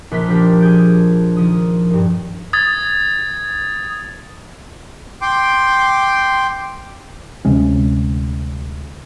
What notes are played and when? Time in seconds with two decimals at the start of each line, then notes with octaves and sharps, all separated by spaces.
0.11 A#1 B4 C6 F6 B6
0.28 F3 A#3 D4 G4 A#4
0.60 G#4 G6 D7
1.36 D#3 F3 D#6
1.90 G2 A#2
2.53 D#6 G#6 A6
5.22 G5 C6 D6
7.45 D2 C3 G#3 C#4